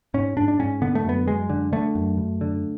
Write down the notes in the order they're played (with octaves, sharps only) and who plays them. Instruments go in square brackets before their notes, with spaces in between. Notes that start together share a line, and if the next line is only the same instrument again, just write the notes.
[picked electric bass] G#2 C#4
G#2 D4
D4
G#2 C#4
D3 B3
A3
F#2 B3
F#2 G#3
D3
D3 A3
F#2
F#2
D3